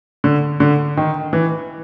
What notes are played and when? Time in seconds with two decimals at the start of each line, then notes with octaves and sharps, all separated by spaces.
0.24 D3
0.60 D3
0.97 D#3
1.33 E3